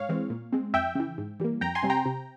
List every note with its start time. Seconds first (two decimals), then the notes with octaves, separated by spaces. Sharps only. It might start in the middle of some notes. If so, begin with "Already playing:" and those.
Already playing: G#2 C#5 F5
0.09 E3 G#3 C4
0.30 A#2
0.53 G#3 C4
0.73 F2 E5 G5
0.95 C#3 E3
1.18 G#2
1.40 E3 G3 A#3
1.61 F2 G5 A#5
1.75 G#5 C6
1.83 C3 G3 C4
1.90 G5 A#5
2.06 C3